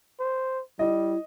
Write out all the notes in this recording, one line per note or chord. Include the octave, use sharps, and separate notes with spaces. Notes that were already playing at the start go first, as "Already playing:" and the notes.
C5
G3 E4 D#5